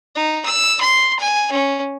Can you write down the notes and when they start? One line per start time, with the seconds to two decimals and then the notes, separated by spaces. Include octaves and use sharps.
0.15 D#4
0.45 E6
0.81 C6
1.19 G#5
1.52 C#4